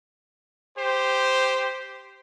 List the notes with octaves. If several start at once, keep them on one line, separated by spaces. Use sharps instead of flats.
G4 C5